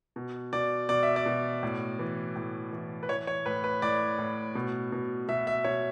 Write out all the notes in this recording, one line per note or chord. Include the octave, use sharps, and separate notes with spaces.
B2
B2 D5
B2 D5
E5
D5
B2
A2
E3
A2
E3
B4
E3 C#5
C#5
A2 B4
B4
A2 D5
A2
B2
B2
B2 E5
E5
B2 C#5